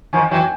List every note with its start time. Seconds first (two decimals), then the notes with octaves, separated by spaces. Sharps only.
0.13 D#3 F3 G#5
0.31 E3 F#3 G5